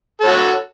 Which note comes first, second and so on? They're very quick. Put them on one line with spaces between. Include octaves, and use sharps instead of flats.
A4 C#5 F#4